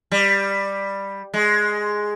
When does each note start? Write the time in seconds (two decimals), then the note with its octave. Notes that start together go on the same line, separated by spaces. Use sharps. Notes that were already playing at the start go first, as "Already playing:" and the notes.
0.12 G3
1.34 G#3